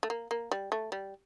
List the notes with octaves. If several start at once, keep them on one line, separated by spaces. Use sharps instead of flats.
A3
A#3
A#3
G3
A3
G3